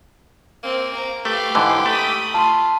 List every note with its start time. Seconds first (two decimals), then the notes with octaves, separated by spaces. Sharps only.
0.63 A#3 C4
0.94 A#5
1.25 A3 G4 B4 F5
1.55 G#2 D3 E3
1.86 A3 B5 D#6
2.34 F4 A5 C6